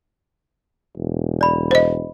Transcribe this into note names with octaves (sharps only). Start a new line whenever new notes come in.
E1
D5 B5
C5 D#5